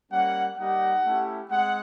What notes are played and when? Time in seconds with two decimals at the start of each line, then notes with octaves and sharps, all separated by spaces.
0.11 G3 A#3 C#4 F#5
0.57 G3 A#3 D#4 G4 F#5
1.04 A3 C#4 E4 G4
1.50 G#3 C4 F#5